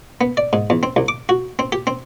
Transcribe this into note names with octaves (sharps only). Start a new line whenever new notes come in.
B3
D5
G#2
E2
C4
C2
D6
F#4
C4
G4
C4